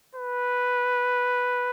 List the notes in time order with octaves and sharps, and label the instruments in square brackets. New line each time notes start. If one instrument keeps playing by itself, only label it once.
[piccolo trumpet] B4